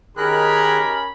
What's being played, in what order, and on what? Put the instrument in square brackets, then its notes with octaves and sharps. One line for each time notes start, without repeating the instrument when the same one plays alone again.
[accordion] D#3 G#4 F#6 [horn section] C#4 B5 [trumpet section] D#4 G4 A#4